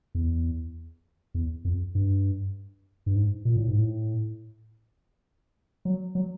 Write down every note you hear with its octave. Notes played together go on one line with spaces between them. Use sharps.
E2
E2
F2
G2
G2
G#2
A#2
A2
G#2
A2
F#3
F#3